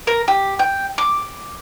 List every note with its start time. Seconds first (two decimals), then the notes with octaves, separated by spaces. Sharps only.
0.07 A#4
0.28 G4
0.59 G5
0.98 D6